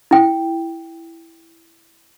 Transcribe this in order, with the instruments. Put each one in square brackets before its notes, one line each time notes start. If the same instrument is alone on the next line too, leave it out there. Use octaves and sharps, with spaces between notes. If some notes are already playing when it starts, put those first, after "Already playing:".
[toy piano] E4 G5